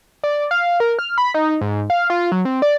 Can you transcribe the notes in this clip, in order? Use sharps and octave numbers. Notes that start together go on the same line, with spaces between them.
D5
F5
A#4
F6
B5
D#4
G#2
F5
F4
F#3
C4
D5